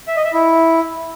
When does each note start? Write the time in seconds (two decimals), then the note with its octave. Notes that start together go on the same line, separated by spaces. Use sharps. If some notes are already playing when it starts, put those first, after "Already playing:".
0.08 E5
0.16 D#5
0.25 E5
0.33 E4